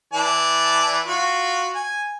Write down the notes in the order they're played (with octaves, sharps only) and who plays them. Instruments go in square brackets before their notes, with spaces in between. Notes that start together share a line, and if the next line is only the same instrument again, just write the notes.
[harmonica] E3 D5 A5
F4 F#4
G#5